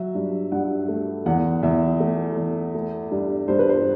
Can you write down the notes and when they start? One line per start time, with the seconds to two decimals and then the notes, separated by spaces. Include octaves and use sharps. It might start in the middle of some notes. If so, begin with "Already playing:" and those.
Already playing: F#3 E5
0.15 G2
0.52 G2 F#5
0.88 A3
1.26 E2 F#5
1.63 E2 E5
2.00 A3
2.37 E2
2.75 A3
3.11 G2
3.48 G2 C5
3.59 B4
3.69 C5